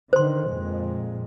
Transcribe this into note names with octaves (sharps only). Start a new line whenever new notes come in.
D3 D#3 C5 C6
F2 A#2 G#3